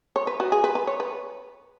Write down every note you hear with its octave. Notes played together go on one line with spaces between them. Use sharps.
C#5
B4
F#4
G#4
B4
B4
C#5
B4